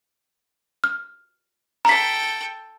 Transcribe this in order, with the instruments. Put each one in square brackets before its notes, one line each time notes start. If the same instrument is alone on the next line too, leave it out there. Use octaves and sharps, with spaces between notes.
[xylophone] F6
[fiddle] A4 G5 [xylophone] A#5 B6